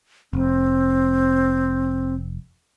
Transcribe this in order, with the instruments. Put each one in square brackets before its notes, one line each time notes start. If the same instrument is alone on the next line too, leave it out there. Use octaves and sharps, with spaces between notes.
[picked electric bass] F1 [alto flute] C4